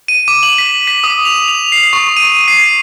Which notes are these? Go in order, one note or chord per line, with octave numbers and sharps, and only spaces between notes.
D#7
D6
F#7
B6
B6
D#6
F7
F7
C7
C#6
D#7
C7